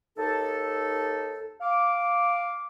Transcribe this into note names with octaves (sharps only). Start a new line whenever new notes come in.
D#2 D#4 A4
F5 D6